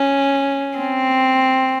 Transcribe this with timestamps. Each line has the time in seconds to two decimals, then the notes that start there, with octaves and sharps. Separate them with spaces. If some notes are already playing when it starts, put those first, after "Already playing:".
Already playing: C#4
0.78 C4